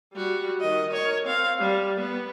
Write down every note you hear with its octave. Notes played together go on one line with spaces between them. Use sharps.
G3 F#4
D#3 D#5
A#4 C#5
C4 F5
G3
B3